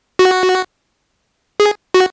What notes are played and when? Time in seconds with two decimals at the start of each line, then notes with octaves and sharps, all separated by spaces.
0.19 F#4
1.60 G#4
1.94 F#4